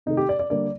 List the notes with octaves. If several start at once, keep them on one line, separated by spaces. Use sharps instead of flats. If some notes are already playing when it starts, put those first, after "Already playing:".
C3 D#3 A3 D#4
G4
D5
D5
D3 G3 A#3 D5